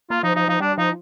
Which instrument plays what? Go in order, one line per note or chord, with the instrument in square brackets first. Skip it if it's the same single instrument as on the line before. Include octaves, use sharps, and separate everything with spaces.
[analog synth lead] A#3 [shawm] F4
[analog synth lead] F3 [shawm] D#4
[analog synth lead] F3 [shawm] D#4
[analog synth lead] F3 [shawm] D#4
[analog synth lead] G3 [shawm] D4
[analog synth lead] F3 [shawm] D#4